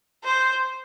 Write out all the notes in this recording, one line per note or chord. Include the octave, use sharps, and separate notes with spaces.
C5